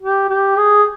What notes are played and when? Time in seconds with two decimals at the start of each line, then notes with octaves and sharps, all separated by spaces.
0.02 G4
0.29 G4
0.58 G#4